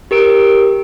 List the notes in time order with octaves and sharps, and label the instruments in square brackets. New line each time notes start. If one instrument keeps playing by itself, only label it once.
[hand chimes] G4 A#4 D7